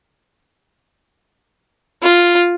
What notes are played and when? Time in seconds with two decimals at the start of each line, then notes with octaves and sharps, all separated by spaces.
2.03 F4